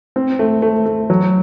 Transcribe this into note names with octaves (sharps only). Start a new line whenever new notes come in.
C4
A3
A3
A3
F#3